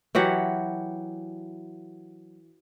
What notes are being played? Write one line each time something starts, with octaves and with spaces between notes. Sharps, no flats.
E3 F#3 G4 F#5